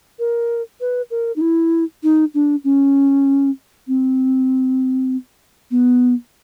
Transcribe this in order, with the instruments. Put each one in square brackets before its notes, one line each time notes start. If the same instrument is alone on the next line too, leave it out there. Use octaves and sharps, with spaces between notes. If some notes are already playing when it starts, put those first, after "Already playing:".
[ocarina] A#4
B4
A#4
D#4
E4
D#4
D4
C#4
C4
B3